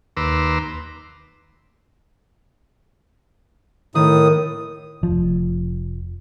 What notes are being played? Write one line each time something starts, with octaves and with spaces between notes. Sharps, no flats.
D#2 B4 A#5 C6 D6 E6
A2 D#3 D#6
F1 F3